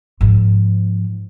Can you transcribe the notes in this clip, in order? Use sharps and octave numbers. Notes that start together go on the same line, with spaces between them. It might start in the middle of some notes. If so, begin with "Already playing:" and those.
G#2 F3